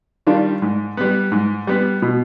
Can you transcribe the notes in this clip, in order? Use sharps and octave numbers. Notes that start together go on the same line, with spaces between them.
D#3 G3 D4 F4
G#2
G3 B3
G#2
G3 B3
B2